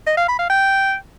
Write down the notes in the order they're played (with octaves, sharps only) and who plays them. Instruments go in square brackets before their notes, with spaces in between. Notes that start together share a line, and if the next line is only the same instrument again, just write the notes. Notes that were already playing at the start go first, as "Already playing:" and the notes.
[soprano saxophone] D#5
F5
B5
F5
G5